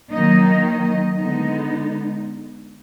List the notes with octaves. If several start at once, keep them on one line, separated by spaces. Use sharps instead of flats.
D#3 F#3 A#3 D#4 D#5
D#5
D3 G#3 B3 D#4 D#5